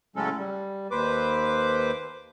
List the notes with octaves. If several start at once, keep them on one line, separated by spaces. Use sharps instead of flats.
A2 C#3 F#3 G#3 C#4 A4
G3
D#2 B4 C5 D6